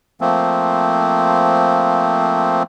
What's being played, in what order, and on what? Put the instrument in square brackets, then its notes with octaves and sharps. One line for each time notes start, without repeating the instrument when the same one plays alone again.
[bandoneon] F3 A3 A#3 C4